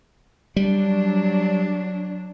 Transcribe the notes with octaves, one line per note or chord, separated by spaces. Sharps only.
F#3 G3 D4